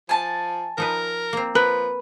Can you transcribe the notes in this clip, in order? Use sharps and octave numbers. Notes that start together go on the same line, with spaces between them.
F3 G#5 A5
F3 D#4 A#4 B4
A#3 C4
F3 A#4 B4